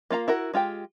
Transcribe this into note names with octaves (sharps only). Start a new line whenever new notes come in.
A#3 F4 F5 A#5
E4 F#4 A#4
G#3 F4 G4 G5